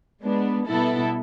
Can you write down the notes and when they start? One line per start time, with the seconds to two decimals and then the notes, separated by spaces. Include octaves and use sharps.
0.23 G#3 B3 D4
0.66 B2 G3 B3 E4 A4